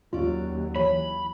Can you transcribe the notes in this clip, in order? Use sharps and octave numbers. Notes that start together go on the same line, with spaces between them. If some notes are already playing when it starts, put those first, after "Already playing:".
D#2 F#3 C#4 F4 D5
E3 C#5 B5